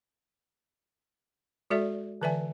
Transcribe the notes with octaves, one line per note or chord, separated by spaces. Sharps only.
G#3 F#4 A4 D5 E5
D3 E3 B4 D5 E5 G#5